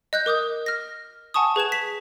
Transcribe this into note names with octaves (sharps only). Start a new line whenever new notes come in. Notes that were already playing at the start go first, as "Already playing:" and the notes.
D#5 F#6 G6
A#4 D6 D#6 G6
F6 A#6
F#5 G#5 A5 C#6 D#6
G#4 B4 G#6 E7
B6